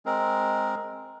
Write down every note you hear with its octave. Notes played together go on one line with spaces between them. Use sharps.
G#3 C4 A#4